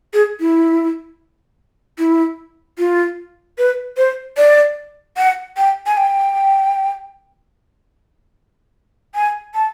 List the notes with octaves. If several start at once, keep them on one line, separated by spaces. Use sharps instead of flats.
G#4
E4
E4
F4
B4
C5
D5
F#5
G5
G#5
G5
G#5
A5